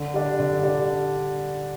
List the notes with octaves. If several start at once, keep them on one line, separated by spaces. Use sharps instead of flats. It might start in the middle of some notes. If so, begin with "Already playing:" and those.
Already playing: D3
G3 D4
D3
G3 D4